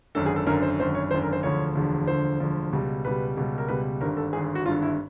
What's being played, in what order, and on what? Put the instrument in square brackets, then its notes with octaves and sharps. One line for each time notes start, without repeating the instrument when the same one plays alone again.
[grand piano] G#1 F#2 D3 A4
G#4
A4
G#1 F#2 D3 A#4
C5
G#1 F#2 D3 C5
C#5
G#1 F#2 D3 C5
A#4
C5
E1 D2 D3 F3 C#5
E1 D2 D3 F3
E1 D2 D3 F3 C5
E1 D2 D3 F3
C#2 B2 G3
C#2 B2 G3 B4
C#2 B2 G3
A#4
C#2 B2 G3 B4
G#1 G2 D3 A#4
A4
G#1 G2 D3 G#4
G#4
F#4
G#1 G2 D3 F4
E4